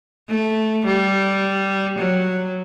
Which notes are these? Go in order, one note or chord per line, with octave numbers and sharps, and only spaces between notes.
A3
G3
F#3